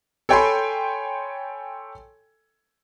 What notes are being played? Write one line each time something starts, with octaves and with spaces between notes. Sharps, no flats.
A4 C#5 G5 G#5 B5 C6